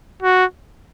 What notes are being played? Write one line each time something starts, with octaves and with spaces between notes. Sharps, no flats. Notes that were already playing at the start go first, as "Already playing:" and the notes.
F#4